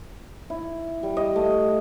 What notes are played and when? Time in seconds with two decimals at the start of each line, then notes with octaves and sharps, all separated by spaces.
0.50 E4
1.03 G3
1.17 D#5
1.36 A3